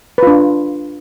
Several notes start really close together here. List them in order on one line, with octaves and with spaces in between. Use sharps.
B4 F4 D4